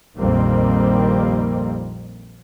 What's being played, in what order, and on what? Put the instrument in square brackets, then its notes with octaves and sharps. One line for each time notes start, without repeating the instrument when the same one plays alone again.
[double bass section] A#1 F2 D#3 G3 A#3 C4